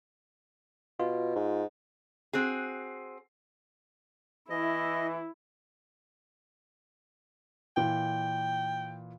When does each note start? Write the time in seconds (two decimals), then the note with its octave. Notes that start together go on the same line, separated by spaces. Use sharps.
1.00 B2 F4
1.36 G#2
2.33 C4 F#4 G#4
4.50 E3 E4 D#5
7.77 A#2 E3 G5